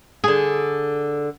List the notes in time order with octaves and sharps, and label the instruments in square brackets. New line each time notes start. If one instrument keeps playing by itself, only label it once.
[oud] D3 G#4